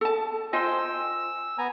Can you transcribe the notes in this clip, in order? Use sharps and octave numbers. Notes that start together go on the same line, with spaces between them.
A4 A5
F4 C5 D#5 G5 G#5 E6
E6
B3 G#5 A#5